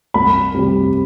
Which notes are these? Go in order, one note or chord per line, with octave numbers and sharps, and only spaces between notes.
C2 B5
C3 G3